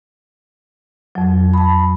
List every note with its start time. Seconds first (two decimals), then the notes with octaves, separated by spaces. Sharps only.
1.15 F2 F#3
1.54 A5 B5